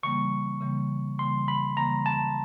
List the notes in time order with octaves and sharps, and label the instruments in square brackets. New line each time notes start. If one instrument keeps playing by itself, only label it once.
[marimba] C#3 E3 G3 A#3 [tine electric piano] C#6
[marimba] C#3 E3 G3 A#3
[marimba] C#3 E3 G3 A#3 [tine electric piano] C6
[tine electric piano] B5
[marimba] C#3 E3 G3 A#3 [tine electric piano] A#5
[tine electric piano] A5